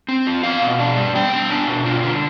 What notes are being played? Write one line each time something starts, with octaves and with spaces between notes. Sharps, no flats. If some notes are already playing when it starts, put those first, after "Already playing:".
C4
F4
B3 F5
B2
D4
G3
B3 G5
B3
D4
B2
F4
D3